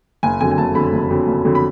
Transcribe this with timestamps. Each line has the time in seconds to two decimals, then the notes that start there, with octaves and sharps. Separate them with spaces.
0.23 F#1 G#5
0.40 F2 D3 F#3 G#5
0.51 G#5
0.58 F#1 A5
0.75 F2 D3 F#3 B5
0.93 F#1
1.10 F2 D3 F#3
1.27 F#1
1.45 F2 D3 F#3
1.55 B5